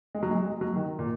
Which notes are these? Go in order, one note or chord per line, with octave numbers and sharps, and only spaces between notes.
G#3
F#3
G#3
G#3
F#3
D#3
A#2